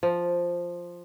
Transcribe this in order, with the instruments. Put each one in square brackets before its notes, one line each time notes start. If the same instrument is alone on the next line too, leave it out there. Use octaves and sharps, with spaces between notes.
[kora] F3